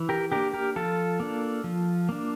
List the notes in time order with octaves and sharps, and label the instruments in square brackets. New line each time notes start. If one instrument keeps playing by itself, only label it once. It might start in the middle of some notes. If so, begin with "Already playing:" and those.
Already playing: [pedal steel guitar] E3
G4 A#4
A#3 D4 G4 A#4
G4 A#4
F3 F4 A4
A#3 D4
F3
A#3 D4